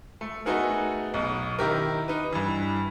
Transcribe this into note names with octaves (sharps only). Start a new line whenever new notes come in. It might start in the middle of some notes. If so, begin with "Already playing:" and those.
A3
A3 B3 D#4 F#4 G#4 A#4
B1 B2
D#3 E4 G4 A#4
D#4 B4
G2 E3